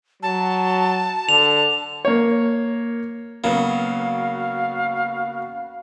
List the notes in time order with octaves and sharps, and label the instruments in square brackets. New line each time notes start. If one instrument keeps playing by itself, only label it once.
[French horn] F#3 [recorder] A5
[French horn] D3 [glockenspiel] F7
[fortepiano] A#3 C#5
[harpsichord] C#3 F#3 [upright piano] A#3 B3 [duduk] F#4 [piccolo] F5